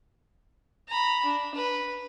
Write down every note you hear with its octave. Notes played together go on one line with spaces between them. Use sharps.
A#5 B5
D4
B4